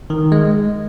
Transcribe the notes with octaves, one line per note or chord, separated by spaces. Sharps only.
D#3
G#3